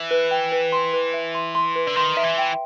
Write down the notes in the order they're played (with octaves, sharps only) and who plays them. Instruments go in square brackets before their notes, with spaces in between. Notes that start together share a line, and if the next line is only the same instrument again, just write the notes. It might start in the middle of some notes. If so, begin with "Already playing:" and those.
Already playing: [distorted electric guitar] E3
[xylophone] B4
G5
B4
C6
B4
E5
C6
C6
B4
[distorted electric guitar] D3
[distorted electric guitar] D#3 [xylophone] C6
[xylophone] E5
[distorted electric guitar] E3
[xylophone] G5